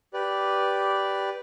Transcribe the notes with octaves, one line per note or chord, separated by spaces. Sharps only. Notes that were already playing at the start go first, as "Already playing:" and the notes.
G4 B4 D5